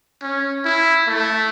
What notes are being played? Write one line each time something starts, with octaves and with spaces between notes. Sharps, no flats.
C#4
E4
A3